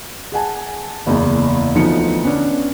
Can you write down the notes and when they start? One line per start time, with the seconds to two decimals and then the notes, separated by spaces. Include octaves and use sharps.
0.32 G#4 F#5 G#5 A5
1.06 F#1 E2
1.75 D2 E3 F3 B3 D#4 C#7
2.24 B3 C#4 D4